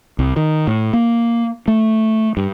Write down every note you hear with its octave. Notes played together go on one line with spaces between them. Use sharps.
C2
D#3
A2
A#3
A3
G2